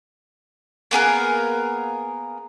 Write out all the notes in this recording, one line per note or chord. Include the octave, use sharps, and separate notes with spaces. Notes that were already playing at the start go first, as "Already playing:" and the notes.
A#3 B3 G#4 A#4